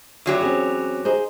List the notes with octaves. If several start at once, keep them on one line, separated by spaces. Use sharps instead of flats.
E2 F#3 G4
C4 C#4 G#4
D#4 G#4 C5